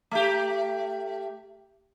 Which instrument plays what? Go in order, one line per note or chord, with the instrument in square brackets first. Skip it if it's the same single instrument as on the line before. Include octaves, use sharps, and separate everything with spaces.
[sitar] A3 G4